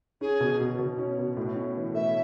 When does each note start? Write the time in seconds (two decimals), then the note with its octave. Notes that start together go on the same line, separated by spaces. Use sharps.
0.21 C#4 G#4
0.40 B2
0.61 B2
0.79 B2
0.98 C#4
1.18 B2
1.37 A2
1.56 C#4
1.76 E3
1.94 A3 E5